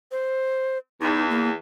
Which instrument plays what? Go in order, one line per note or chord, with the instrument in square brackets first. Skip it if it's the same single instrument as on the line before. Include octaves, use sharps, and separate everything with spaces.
[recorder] C5
[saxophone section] E2 [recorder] D#4
[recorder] A#3